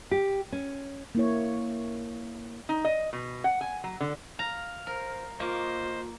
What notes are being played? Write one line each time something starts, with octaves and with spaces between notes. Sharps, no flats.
G4
C#4
A#3 E4 C#5
D#4
D#5
B2
F#5
G#5
F#3
D3
F5 A#5
A#4 C5
A#3 F4 C5 D#5 C#6 D6